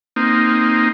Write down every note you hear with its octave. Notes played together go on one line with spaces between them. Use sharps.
A#3 C4 D#4